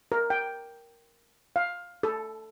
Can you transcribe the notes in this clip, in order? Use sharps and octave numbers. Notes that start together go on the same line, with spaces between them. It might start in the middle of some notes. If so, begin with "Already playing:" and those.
A#4
G5
F5
A4